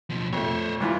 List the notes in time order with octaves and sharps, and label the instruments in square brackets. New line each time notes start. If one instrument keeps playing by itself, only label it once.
[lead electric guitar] B2 F3
[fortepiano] F2 A3 [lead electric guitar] C5 C#5
[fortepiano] C2 E3 F4